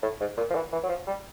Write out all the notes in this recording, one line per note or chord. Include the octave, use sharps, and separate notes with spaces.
A2
G#2
A#2
F3
E3
E3
F#3
F3
G3